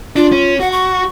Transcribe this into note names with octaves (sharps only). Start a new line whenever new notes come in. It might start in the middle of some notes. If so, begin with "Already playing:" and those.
D4 F4
C#4
F#4 F#5
C#6